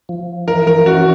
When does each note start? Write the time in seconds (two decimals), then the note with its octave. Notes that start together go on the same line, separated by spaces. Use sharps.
0.09 F3
0.47 E3 A#4
0.67 A#4
0.86 C#4 F#4